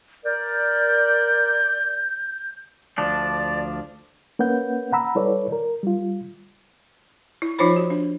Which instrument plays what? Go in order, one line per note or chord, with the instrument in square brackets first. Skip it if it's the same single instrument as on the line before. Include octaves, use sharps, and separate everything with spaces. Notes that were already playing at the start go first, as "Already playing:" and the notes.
[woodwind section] A#4 D5 [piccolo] G6
[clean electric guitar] D2 F3 D4 [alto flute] D5
[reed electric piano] A#3 C#4 B4 F#5 G6
F#5 A#5 B5 E6
G3 E4 A4 B4 C#5 D5
A#4
G3 F4
[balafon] E4
F3 D#4 F4 C5 C#5 B5
F#4
D4